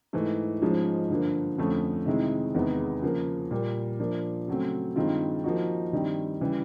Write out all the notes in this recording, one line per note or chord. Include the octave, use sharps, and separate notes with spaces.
G#2 E3 A3
G#2 F3 G#3 C#4
G2 D3 F3 A#3
F2 D3 F3 A3 C#4
C3 D#3 G#3 C4 E4
E2 C3 D#3 G#3 B3
C#3 F3 A#3
A#2 G3 A#3
F3 A#3 D4
C#3 F#3 A3 C4
G2 D#3 G#3 C4 F4
F3 A#3 D#4 F#4
G2 D#3 G3 C4
C#3 E3 G3